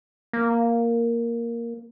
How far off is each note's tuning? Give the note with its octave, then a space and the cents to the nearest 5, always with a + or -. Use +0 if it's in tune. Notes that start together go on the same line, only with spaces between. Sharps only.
A#3 +0